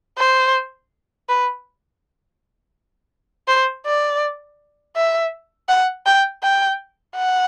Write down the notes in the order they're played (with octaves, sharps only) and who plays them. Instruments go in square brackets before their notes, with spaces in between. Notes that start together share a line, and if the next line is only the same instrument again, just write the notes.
[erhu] C5
B4
C5
D5
E5
F#5
G5
G5
F#5